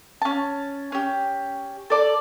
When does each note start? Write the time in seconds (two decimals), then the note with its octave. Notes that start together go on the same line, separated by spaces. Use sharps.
0.22 C#4 A5
0.92 C#4 G4
1.90 A4 D5 A5